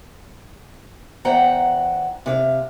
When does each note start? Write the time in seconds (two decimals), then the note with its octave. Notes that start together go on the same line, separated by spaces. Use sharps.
1.25 E2 C5 F#5 G5 A#5
2.26 C3 C#5 F5